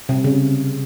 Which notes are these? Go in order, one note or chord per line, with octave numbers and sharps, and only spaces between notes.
C3
C#3